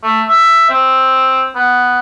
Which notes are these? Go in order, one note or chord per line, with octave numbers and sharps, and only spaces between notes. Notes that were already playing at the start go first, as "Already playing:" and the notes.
A3
E5
C4
B3